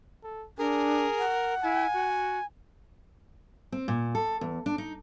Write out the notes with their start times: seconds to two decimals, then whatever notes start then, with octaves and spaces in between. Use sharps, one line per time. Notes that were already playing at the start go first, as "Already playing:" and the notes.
0.23 A4
0.58 D4 G#4 A#4
1.19 F#5
1.63 E4 G#5
1.94 F#4
3.72 C4
3.88 A#2
4.15 A4
4.41 E2
4.66 D4
4.78 D#4